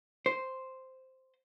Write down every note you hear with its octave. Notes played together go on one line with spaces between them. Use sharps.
C5